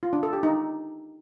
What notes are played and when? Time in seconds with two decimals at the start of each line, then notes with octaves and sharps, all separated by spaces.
0.03 F4
0.13 D4
0.23 A4
0.33 G4
0.43 D#4